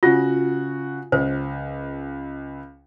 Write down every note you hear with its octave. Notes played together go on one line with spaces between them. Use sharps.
C#3 F4 F#4
C#2 C5